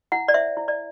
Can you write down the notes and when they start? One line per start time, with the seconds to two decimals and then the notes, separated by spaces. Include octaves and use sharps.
0.12 E4 F#5
0.28 D5
0.34 C5 E5
0.57 E4
0.68 D5